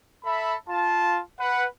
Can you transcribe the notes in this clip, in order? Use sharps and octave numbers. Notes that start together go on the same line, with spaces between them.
A4 E5 B5
F4 A5
B4 F#5